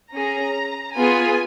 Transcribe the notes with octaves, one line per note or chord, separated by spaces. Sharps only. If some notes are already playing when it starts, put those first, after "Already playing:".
C#4 G#4 A#5
B3 F4 G#4 G#5